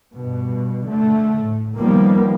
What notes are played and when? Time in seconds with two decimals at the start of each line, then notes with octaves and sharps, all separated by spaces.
0.14 G2 B2
0.86 D3 A3
1.39 A2
1.78 D#3 F3 G3 A#3 B3